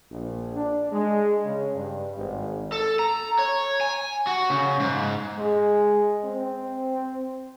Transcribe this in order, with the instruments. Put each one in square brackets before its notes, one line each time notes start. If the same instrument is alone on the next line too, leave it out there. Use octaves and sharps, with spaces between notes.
[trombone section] A#1
D4
G#3
C#3
G2
G#1
[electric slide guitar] A4
A#5
C#5
G#5
F#4
C#3
G#2
[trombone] G#3
C4